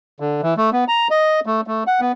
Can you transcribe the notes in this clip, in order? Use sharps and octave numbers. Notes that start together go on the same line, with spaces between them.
D3
E3
A3
B3
A#5
D#5
A3
A3
F#5
B3